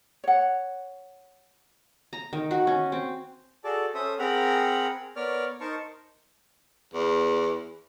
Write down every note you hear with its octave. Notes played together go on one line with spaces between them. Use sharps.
C#5 F#5
A#5
D#3
F#4
C#4
C4
F#4 G#4 A4 D5 A5
C#4 A4 C5 E5 D#6
C4 G#4 A#4 F#5 A#5 B5
B3 A#4 C#5 D5 F6
D#4 A#4 C5 A5 C#6
E2